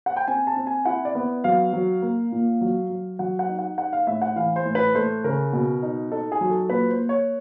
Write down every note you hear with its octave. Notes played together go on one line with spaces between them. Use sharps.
F#5
G5
C4 G#5
A5
C4
G#5
E4 F#5
D5
B3
F#3 F5
F#3
A#3
A#2
F#3
F#3
F#3 F#5
F#5
D#4
F#5
D#4 F#5
F5
A2 E5
F#5
E3 F5
C5
A2
B4
A3 C5
C#3 A#4
B2
D#4
D#4 A4
G#4
F#3
A4
A#2 B4
C5
A#3
C#5